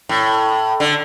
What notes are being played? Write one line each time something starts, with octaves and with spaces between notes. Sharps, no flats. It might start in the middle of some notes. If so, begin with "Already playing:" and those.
A2
D3